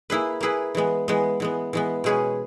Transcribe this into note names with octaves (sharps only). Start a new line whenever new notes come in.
A#3 E4 G#4 B4
A#3 E4 G#4 B4
E3 G#3 B3
E3 G#3 B3
E3 G#3 B3
E3 G#3 B3
B2 G#3 C#4 G#4 B4